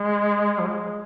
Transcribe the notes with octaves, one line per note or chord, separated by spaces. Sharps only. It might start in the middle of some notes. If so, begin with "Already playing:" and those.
Already playing: G#3
F3
G#3